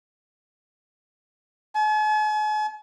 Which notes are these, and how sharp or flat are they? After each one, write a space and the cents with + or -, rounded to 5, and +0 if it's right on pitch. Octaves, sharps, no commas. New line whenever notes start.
G#5 +45